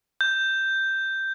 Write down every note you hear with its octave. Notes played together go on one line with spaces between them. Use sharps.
G6